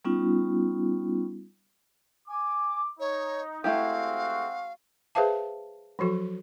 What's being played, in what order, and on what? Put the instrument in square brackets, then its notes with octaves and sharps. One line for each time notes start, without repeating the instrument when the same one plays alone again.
[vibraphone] G3 B3 C#4 D#4 F4
[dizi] G#5 [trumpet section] D6
[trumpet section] D#4 [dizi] C#5
[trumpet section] G#3 C4 F#4 [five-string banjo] A3 E4 G4 [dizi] F5
[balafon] G#4 B4 C5 E5 F5 A5
F3 F#3 F#4 A4